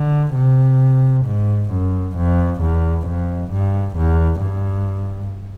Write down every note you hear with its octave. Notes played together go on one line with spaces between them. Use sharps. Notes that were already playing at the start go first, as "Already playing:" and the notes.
Already playing: D3
C3
G#2
F#2
F2
E2
F2
G2
E2
G2